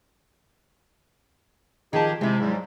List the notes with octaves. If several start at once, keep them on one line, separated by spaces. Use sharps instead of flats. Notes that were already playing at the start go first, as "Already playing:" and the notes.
D#3 F3 D#4 G4 G#4 A5
C3 G#3 E4
G#2 F#3 G3